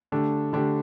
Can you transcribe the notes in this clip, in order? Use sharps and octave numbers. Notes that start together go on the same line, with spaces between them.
D3 A3 D4 G4
D3 A3 D4 G4